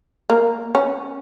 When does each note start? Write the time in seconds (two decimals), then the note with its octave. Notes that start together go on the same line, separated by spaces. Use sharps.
0.30 A#3
0.75 C#4